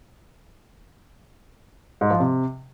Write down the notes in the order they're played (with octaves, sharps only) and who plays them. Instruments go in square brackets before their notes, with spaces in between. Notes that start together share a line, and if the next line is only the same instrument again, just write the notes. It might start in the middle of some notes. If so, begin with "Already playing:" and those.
[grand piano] G#2
F3
C3